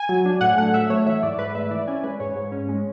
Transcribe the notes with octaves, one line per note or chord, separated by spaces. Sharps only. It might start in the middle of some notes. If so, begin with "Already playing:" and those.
Already playing: G#5
F#3
D4
A2 F#5
A3 F#5
F#3 E5
A3 C#5
E3 E5
G#2 D5
G#2 B4
A3 E5
E3 D5
C#4 G#5
G#3 B4
G#2 C#5
G#2
C#4
G#3